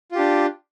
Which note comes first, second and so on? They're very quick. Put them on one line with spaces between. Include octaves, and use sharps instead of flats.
F4 G4 D4